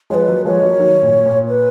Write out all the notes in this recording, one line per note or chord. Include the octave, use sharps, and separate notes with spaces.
F3 G#3 B4 C#5
F#3 A#3
F3 G#3 C#5
F#3 A#3
D#3 F#3
A#2
A#2
B4